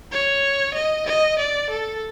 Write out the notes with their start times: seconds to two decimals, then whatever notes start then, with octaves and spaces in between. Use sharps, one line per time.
0.12 C#5
0.75 D#5
1.06 D#5
1.38 D5
1.70 A4